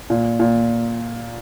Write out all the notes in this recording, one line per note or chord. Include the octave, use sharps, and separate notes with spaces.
A#2
A#2